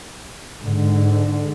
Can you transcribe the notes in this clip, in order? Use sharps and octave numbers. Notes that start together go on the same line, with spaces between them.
G#2 D3